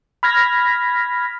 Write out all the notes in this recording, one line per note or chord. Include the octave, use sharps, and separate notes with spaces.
B5 F6 G#6 A#6 B6